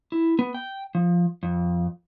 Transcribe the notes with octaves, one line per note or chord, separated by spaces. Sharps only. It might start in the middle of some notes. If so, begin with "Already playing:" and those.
E4
B3
G5
F3
F2